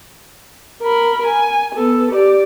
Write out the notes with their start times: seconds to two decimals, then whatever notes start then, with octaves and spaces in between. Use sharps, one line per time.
0.83 A#4 B5
1.26 G#5
1.75 B3 A4
2.12 G4 D5